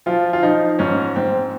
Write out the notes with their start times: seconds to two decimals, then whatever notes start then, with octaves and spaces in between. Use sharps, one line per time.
0.06 F3 F4
0.33 F4
0.42 F3 D#4
0.79 G#2 C#4
1.16 G#2 C4